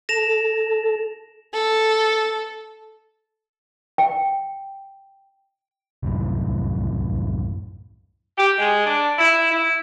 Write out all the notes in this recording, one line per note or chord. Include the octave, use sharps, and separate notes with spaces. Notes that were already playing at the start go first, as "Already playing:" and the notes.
A4 A#6 E7 F7
A4
G5
C2 F#2 A2
G4
G#3
D4
E4
E4